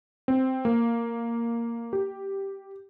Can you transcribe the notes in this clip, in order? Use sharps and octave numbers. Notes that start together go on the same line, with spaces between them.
C4
A#3
G4